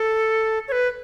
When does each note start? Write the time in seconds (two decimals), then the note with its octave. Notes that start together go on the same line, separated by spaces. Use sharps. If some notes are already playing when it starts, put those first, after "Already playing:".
Already playing: A4
0.68 C#5
0.72 B4